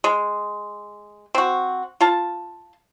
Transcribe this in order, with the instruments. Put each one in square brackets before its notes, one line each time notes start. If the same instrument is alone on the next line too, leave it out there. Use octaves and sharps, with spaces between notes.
[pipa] G#3
C4 F#4
F4 A5